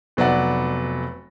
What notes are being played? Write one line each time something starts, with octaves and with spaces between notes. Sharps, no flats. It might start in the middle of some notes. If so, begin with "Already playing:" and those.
F1 F#3 B3 D5 F#5